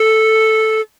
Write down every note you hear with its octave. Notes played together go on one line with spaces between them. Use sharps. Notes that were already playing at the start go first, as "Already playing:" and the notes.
Already playing: A4